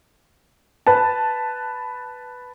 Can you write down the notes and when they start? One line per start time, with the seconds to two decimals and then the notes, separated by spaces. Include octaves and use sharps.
0.87 B4 A5